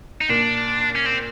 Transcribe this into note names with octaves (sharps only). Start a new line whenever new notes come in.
D#4
A#2 D4
C#4
C4